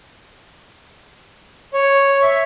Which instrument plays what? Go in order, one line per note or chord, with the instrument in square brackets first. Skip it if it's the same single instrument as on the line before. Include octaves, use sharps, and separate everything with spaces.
[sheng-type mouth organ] C#5
E5